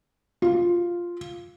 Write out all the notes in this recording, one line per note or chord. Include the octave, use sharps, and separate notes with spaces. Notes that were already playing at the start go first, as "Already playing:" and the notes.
F4